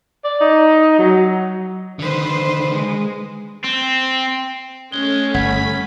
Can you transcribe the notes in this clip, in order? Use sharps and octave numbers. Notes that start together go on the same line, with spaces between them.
D5
D#4
F#3
D3 D#3 B4 C5
G#3
C4
G#3 A3 C#4 G7
G1 F#5 B5 G#6